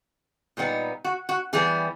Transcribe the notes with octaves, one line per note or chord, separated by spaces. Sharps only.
A#2 G3 B3 D#4
F#4
F#4
E3 G3 B3 G#4